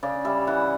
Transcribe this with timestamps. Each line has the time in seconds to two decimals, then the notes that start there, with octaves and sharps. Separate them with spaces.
0.03 C#3 D5
0.25 G3 E5
0.47 E3 F#5